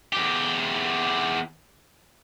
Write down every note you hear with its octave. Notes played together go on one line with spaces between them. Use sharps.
E2 G4